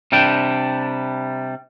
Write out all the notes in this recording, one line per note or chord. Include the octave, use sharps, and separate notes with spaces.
C3 G3 D4 G5